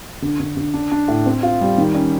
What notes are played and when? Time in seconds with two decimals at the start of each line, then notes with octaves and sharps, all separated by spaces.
0.22 D3
0.40 D3
0.57 D3
0.74 D4
0.92 D4
1.08 A2
1.26 C4
1.43 F4
1.61 G3
1.78 D#3
1.95 C#4